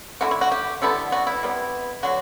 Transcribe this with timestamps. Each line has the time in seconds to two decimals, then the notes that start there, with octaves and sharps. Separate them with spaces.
0.21 D3 A3 E4 F#4
0.31 E4
0.41 F#4
0.52 G4
0.82 D3 G3 B3 E4 A4
1.12 F#4
1.27 E4
1.43 C3 G3 B3 E4
2.03 D3 F#3 F#4